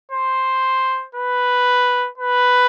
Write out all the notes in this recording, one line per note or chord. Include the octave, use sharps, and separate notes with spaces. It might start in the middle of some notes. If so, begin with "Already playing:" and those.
C5
B4
B4